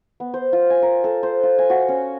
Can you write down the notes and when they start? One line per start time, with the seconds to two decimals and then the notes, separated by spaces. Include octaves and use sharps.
0.20 B3
0.34 C5
0.53 F4
0.70 G#5
0.82 A#4
1.04 A4
1.23 C5
1.43 F4
1.58 G#5
1.70 F#4
1.88 C#4